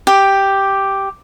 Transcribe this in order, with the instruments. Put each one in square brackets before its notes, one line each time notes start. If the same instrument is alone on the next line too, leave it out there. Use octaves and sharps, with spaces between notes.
[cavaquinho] G4